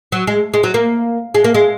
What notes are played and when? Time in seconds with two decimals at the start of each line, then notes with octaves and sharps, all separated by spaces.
0.12 F#3
0.27 G#3
0.54 G#3
0.63 F#3
0.74 A#3
1.35 G#3
1.44 A#3
1.54 G#3